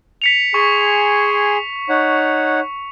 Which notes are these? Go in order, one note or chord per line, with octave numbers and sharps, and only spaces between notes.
B6 C#7 F7
G#4 G#5 C6 C#6
D#4 C#5 F#5